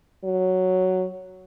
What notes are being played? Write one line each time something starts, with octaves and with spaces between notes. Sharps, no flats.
F#3